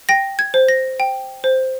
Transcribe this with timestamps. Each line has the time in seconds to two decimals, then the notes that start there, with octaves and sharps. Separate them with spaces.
0.09 G5 A#6
0.39 G#6
0.54 C5
0.68 A#6
1.00 G5
1.44 C5